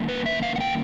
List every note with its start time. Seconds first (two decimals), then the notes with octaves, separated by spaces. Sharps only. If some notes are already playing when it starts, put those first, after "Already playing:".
Already playing: D#3 G3 A#3 C#4 E4
0.09 B4
0.26 E5
0.43 F5
0.56 F#5
0.60 G5